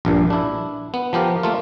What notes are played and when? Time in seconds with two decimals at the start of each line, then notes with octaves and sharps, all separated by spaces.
0.05 A#1 G2 A#2
0.30 D4 E4
0.94 B3
1.13 F3 B3 G4 A#4
1.43 A3 A#3 F4